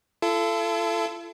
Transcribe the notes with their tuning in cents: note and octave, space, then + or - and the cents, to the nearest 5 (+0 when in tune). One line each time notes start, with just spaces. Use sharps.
F4 -45 A4 +0